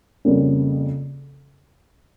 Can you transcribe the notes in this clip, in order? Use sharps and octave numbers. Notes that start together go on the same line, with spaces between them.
F2 C#3 G3 A#3 C#4